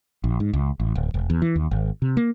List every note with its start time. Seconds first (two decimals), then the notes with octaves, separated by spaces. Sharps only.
0.24 A#1
0.40 G#2
0.53 C#2
0.80 A1
0.95 D1
1.14 E1
1.30 E2
1.42 E3
1.56 D#2
1.71 G#1
2.02 C3
2.17 A#3